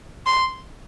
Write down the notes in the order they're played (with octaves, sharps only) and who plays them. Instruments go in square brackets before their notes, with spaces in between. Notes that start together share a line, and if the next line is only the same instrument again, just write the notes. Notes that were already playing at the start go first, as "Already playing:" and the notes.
[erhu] C6